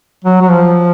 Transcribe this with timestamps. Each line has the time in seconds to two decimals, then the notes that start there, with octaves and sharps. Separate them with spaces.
0.25 F#3
0.42 F#3
0.50 F3